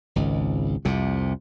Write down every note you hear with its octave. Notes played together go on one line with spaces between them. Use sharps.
G#1 C#2
C2 F2 C3